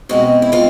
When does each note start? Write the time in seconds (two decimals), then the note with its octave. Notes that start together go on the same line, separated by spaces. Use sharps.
0.09 B2 G#3 C4 F#4
0.42 E4
0.52 G#3 C4 F4